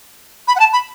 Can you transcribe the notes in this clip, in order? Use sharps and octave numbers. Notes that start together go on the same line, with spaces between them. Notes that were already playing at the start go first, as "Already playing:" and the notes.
B5
F#5
A5
B5